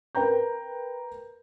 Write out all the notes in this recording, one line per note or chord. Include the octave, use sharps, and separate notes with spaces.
A#4 B4 G5 A#5 G6